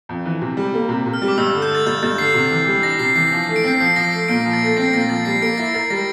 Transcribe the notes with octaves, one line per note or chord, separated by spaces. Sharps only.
F2
E3
C3
G3
A#3
C3
C3
F6
G3
D6
G2 E6
D3
G6
A3 A6
G2 G6
G2 A6
D3 C7
C3
E3
G3
D4 A#6
C3 C7
E3 C7
F3
C7
A3
D7
C4 C7
F3 C7
F3 A#6
A3 C7
A#2 D7
F3
A6
A3 A#6
C4 C7
A#2 A#6
F3 A6
G3 C7
A#3 D7
E4 A#6
A#4 A6
G3 A#6